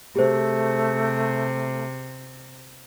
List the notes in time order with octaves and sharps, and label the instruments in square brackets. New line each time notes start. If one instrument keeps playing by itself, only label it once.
[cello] C3 [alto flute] A3 [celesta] G4 G#4 C5